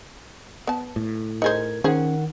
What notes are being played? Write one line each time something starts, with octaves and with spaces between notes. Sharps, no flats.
B3 A5
A2
D#4 G#4 A#4 C5 G#6
D#3 C#4 G#4 C5 F#5